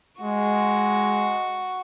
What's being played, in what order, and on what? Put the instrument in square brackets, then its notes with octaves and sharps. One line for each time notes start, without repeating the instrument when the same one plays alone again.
[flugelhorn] G#3 [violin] F#4